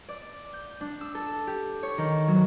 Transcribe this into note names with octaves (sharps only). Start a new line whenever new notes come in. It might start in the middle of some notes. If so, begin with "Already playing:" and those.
D5
G6
D4
E6
A4
G4
C#5
D#3
F#3